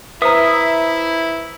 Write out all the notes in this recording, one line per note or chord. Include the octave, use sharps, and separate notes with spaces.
E4 B4 C5 E5 A#5 D#6